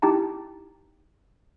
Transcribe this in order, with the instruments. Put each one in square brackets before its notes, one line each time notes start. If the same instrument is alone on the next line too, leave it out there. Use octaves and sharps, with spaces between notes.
[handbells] D#4 E4 G4 G5 A5 A#5